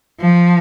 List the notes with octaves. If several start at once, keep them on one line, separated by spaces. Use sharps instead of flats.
F3